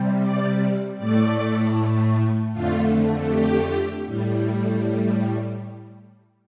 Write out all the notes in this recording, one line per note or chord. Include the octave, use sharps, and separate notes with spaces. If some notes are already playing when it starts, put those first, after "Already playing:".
Already playing: C3 G3
D5
A2 A3 D5
F2 D3 A3 F4
G4
A2 G3